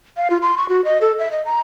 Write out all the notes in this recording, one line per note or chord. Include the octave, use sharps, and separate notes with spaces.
F5
F4
C6
C#6
F#4
D#5
A4
E5
D#5
A#5